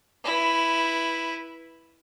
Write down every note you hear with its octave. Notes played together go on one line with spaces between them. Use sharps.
E4 B4